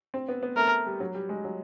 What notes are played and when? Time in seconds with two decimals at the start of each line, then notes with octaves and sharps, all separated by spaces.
0.14 C4
0.29 B3
0.43 B3
0.57 A3 A#4
0.86 G3
1.00 F#3
1.15 G3
1.29 G#3
1.44 F#3